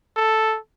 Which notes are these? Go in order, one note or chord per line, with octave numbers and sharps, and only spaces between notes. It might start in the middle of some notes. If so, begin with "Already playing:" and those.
A4